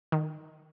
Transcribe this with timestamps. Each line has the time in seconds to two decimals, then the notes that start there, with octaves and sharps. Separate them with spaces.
0.12 D#3